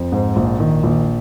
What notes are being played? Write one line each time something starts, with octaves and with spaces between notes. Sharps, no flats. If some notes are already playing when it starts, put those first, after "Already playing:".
Already playing: F2
G#2
A#1
D#3
A#1